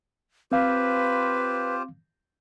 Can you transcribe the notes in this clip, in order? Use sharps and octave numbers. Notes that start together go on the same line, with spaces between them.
C4 F4 G4 B4 C5 F5